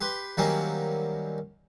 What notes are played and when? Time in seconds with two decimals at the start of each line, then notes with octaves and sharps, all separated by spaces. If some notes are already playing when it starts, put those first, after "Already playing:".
0.01 G4 B4 C6
0.37 D#3 F#3 G3 A#3 C4 C#4